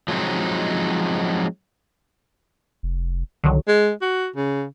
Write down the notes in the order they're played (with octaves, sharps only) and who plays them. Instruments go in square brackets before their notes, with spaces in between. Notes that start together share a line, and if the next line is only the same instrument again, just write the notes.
[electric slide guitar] F3 F#3 G#3 C4 D#4
[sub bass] F1
[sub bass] C2 [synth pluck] D3 D#3 F#3
[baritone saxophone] G#3
F#4
C#3